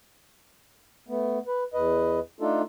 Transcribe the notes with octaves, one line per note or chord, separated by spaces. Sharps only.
A3 B3
B4
E2 B4 D#5
A3 D4 D#4 F4 A4